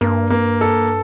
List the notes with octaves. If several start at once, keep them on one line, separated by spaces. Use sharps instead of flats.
G2 A#3
A#3
A4